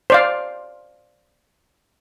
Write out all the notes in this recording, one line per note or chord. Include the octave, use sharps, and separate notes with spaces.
C5 D5 F5